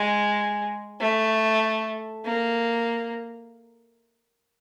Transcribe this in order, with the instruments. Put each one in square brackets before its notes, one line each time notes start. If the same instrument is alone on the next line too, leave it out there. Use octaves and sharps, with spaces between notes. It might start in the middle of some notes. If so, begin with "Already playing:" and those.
Already playing: [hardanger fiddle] G#3
A3
A#3